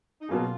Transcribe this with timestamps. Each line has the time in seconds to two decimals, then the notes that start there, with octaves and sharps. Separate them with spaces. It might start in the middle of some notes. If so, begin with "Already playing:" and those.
0.20 D#4
0.29 B2 F#3 A#3 C#4 F4 G#4